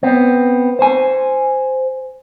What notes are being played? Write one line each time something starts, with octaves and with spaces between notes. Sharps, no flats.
B3 C4
C5 G#5